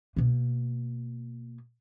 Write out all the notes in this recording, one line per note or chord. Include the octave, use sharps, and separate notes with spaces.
B2 A#3